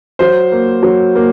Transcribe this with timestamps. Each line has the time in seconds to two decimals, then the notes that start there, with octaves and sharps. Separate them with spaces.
0.19 F#3 C5
0.52 A#3
0.83 F#3
1.15 A#3